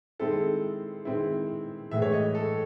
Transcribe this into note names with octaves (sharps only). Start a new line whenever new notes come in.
D#3 G#3 C4 E4 A4
D#3 G#3 C4 E4
A2 E3 G#3 E5
C#5
D#5
A4